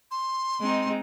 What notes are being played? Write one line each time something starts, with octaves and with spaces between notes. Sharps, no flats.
C6
G#3 C4 D#4